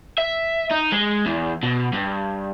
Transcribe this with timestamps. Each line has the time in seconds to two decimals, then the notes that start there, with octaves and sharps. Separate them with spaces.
0.18 E5
0.71 D#4
0.92 G#3
1.26 E2
1.63 B2
1.92 G2